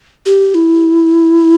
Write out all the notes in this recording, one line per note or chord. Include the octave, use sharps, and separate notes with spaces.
G4
E4